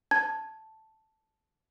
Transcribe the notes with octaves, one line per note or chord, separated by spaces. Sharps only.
A5 G#6